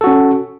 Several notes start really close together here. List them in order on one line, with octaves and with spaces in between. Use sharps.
A4 F#4 C#4